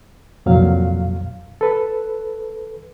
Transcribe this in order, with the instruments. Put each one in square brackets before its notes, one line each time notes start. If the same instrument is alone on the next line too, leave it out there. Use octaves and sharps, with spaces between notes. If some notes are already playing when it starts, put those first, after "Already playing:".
[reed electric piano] C2 F2 A#2 F#3 F5
A4 B4